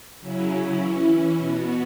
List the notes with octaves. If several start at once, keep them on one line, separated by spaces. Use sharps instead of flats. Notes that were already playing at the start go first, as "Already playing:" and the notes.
C#3 F#3 C#4 E4
E3 C#4 E4
B2 B3 F#4